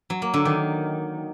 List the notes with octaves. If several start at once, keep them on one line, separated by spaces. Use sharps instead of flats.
F#3
A#3
D3
D#3